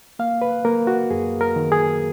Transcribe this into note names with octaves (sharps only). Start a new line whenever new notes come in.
A#3 F5
B4
A#3 A#4
F#4
F#2 G#4
A#4
D#3
G#4